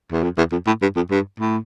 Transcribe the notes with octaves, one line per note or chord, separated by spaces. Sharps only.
E2
F2
E2
F2
A2
G2
F2
G2
A2